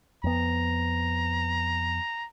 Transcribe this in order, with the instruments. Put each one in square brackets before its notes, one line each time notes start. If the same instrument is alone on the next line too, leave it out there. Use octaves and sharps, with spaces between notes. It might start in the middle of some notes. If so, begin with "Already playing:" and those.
[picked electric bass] F2 B3 [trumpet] A#5